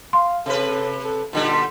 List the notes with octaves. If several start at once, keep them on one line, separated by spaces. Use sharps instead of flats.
F5 C6
C3 A4 B4
A4
A#2 D3 G3 D#4